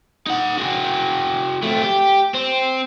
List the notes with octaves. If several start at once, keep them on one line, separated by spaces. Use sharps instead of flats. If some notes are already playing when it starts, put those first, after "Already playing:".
D#4 F#5
F#4 G#4
A3 C4
G4
C4